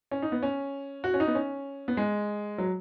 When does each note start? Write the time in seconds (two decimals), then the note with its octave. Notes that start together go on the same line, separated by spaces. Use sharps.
0.11 C#4
0.22 D#4
0.32 B3
0.43 C#4
1.04 F#4
1.14 C#4
1.20 D#4
1.27 B3
1.35 C#4
1.88 B3
1.97 G#3
2.58 F#3